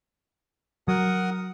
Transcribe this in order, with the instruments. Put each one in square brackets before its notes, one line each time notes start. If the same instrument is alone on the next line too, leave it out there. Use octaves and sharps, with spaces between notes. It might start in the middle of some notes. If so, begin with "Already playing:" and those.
[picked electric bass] F#3 [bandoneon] A#4 F#5 D#6